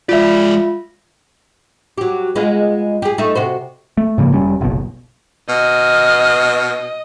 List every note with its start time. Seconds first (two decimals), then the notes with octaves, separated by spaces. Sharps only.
0.09 G#3 F4 D5 E5
1.97 F#3 G4
2.36 G#3 B3 F4
3.02 G4 G#4
3.18 A3 D#4 E5
3.35 C3 F#4 C5
3.97 A3
4.18 G#2 C#3 F3 A#3
4.33 F1 G3 C#4
4.61 F#1 B1 B2
5.49 B2 D#5 F6